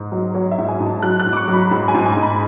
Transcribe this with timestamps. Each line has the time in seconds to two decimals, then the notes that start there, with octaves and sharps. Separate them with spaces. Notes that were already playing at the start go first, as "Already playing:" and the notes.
Already playing: G#2
0.12 F#3
0.34 F#3 C#5
0.51 E5
0.58 G#2
0.68 G#5
0.80 G#2
0.86 A5
1.03 F#3 F#6
1.20 F#6
1.26 G#2
1.33 D6
1.37 C#6
1.48 F#3
1.54 B5
1.71 G#2 B5
1.88 G#5
1.94 G#2
2.06 G#5
2.17 G#2
2.23 B5